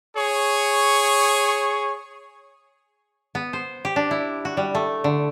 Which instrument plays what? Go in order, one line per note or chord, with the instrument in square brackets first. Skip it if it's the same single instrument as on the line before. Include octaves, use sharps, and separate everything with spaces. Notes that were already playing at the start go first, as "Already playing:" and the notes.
[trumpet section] G#4 C#5 C#6
[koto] B3
C5
G4
D4
E4
F#4
G3
A3
D3